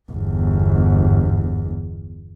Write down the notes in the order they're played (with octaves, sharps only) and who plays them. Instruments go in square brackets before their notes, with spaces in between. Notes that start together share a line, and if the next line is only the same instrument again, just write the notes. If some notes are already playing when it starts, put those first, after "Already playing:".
[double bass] G1 E2